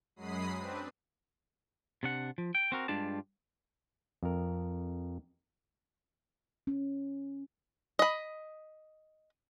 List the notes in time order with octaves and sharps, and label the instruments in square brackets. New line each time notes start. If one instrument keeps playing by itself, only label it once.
[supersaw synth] F#2 F#3 G#3 B5 D#6 C7
C4 D4 B4
[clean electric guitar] C3 D4 F#5
F3
G5
C4 F#4 A#4
G2 G#3 D4 F4 G4 A5
[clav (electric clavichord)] F2 A#4
[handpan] C#4
[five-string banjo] D#5 B5